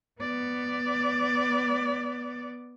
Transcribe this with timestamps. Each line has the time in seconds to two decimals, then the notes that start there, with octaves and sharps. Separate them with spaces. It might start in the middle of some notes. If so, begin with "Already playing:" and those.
0.21 B3 D5